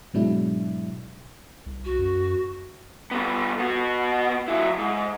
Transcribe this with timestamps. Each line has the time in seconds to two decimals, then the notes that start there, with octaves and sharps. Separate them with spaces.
0.14 G#2 B2 F#3 G#3 D4 E4
1.66 C2
1.85 F#4
1.99 F#2
3.11 G3 B3
3.59 B3 F#4
4.48 F#3 E4
4.78 G#2